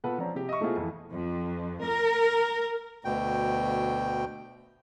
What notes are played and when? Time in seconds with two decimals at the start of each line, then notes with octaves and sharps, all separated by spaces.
0.04 B2 F4 A4 B4 F#5
0.18 F3 C4 C#4 D5 A#5
0.35 C3 G4
0.49 D#5 E5 C#6
0.61 B2 A3 C4 E4 F4 G#4
0.76 F2 E3
1.12 F2
1.83 A#4
3.05 D2 B2 G5